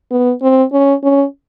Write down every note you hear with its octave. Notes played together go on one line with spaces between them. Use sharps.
B3
C4
C#4
C#4